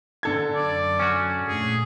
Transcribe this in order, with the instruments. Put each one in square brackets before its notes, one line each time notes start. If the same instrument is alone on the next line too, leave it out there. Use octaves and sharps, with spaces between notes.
[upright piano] D3 A4 G#6
[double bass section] F#2 [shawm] D5
[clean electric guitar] C#4 F#4
[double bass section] A#2 A3 [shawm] G#4